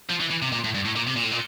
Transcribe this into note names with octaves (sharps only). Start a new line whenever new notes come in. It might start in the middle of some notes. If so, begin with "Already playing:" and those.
F3
E3
E3
C3
A#2
A2
G2
A2
A#2
C3
A#2
A2
A#2